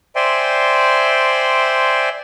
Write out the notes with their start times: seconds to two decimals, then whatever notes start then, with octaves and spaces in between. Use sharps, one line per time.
0.16 C5 D5 E5 G5 G#5 C6